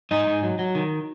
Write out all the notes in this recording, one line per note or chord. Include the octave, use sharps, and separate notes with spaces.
G#2 D#4 D#5
G#2
F#3
F#3
D#3